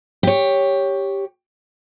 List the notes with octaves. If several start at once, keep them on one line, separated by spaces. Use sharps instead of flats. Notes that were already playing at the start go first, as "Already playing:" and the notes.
G4 C#5